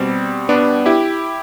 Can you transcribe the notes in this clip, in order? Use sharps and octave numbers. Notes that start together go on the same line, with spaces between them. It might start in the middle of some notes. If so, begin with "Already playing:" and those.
Already playing: B2 G3 C4
B3 D4
E4 G4